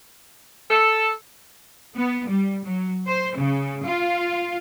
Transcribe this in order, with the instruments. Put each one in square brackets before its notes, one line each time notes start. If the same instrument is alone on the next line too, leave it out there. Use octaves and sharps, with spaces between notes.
[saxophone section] A4
[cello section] B3
G3
F#3
C5
C#3
F4